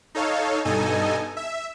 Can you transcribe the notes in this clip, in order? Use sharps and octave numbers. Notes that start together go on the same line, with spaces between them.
D#4 A4 C#5 F5
G2 B2 D#4 A4 D#5 G#5
E5